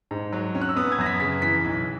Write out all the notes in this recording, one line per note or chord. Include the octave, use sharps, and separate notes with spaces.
G#2
F#3
C#4
F#6
E6
B3 D#6
G#6
F#2 A#6
B6
C#3 B6
E3 B6
B1